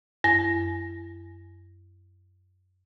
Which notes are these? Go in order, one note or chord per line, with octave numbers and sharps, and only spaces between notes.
F#2 A#6